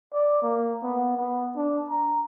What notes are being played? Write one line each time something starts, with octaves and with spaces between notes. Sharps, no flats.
D5
A#3
B3
B3
D4
A#5